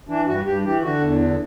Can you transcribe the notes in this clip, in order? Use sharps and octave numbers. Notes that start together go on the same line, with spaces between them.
E3 D4
G2 F#4
G2 G4
E3 G4
D3 F#4
E2
D3